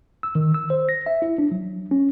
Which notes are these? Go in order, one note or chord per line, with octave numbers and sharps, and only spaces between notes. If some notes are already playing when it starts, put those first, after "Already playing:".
E6
D#3
E6
C5
A#6
E5
E4
D4
F#3
C#4